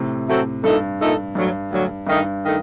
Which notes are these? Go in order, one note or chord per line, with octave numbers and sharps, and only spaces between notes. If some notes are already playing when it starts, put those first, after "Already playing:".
Already playing: A2 C3
F#3 A3 C4 F#4 A4
G2 A#2 A3 D#4 A4
A#2 A3 D#4 A4
D2 G2 D3 F#3
D2 D3 F#3
G2 D#3 A3 D#4
D#3 A3 D#4